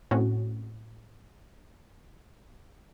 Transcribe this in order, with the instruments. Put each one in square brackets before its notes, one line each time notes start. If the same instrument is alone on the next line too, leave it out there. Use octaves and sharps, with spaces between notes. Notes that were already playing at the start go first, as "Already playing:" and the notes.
[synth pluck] A2 C4 C#4 F#4